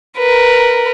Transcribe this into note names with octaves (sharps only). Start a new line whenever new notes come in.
A#4 B4